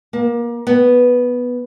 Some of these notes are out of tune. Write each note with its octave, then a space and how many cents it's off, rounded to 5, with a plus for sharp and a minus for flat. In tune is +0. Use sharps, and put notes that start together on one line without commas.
A#3 +25
B3 -5